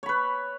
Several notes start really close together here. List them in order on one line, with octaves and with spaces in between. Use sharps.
C#5 B5 B4